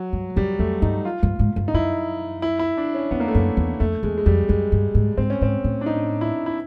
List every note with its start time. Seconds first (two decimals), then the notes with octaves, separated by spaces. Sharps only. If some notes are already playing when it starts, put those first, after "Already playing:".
Already playing: F#3
0.13 G2
0.36 F#2 G3
0.59 F2 A3
0.82 G2 D#4
1.05 F4
1.23 G2
1.39 G#2
1.56 G2
1.68 D#4
1.74 F#2 E4
2.42 E4
2.59 E4
2.77 D4
2.95 C#4
3.11 F2 B3
3.20 A#3
3.28 A3
3.35 F#2 A#3
3.57 E2
3.80 F2 A3
4.03 E2 G#3
4.18 G#3
4.26 F2 G3
4.49 F#2 G#3
4.72 G2
4.95 G#2
5.17 G#2 C4
5.30 C#4
5.41 G#2 C4
5.64 A2
5.81 D4
5.86 D#4
6.21 E4
6.46 E4